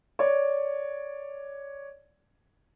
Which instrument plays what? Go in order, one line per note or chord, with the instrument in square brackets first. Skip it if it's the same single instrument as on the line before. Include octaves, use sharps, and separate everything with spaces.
[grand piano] C#5 D5